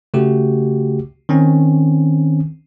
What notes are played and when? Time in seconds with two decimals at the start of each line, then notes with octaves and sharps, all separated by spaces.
0.14 C#3 A3 F#4 G4
1.29 D#3 C4 C#4